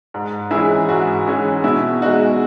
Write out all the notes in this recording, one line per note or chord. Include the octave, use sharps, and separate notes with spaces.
G#2
E3 G#3 C#4 E4 G#4
G#2 F#4
E3 G#3 C#4
B2 E4
G#3 D#4 F#4